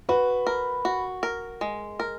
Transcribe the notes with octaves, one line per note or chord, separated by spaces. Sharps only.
F#4 B4
A#4
F#4
A#4
G#3
A#4